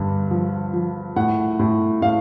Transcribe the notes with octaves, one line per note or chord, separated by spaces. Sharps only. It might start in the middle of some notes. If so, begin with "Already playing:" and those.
Already playing: G2 D3
F3
F3
A2 F#5
A2
A2 F5